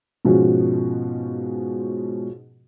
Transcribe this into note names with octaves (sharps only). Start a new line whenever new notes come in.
G#2 B2 F3 G#3 C#4 F#4